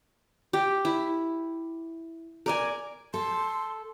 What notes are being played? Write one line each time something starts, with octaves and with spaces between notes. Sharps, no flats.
G4
E4
A#4 D5 G#5
A4 C6